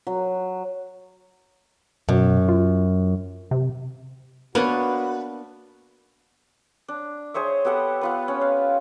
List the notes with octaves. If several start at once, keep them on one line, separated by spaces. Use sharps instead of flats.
F#3
F#2 B2
F4
C3
A#3 B3 D4 F#4 B4 C#5
D4
G#4 C5 C#5 E5
B3 G4 A4 F#5
B3 F4 B4
C#4
F5